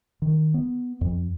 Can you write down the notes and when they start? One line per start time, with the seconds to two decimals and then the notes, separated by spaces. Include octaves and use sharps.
0.22 D#3
0.54 B3
1.01 F2